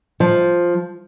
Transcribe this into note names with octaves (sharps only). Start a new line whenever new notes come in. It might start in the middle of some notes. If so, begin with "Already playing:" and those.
F3